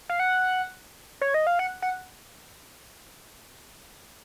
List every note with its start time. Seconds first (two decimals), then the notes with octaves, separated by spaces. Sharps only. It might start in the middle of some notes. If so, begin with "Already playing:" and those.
0.09 F5
0.20 F#5
1.21 C#5
1.34 D#5
1.47 F5
1.59 F#5
1.82 F#5